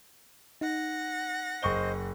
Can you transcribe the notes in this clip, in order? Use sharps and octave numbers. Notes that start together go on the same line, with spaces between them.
D#4 F#5 A#6
F#1 C5 D#5 C#6 G7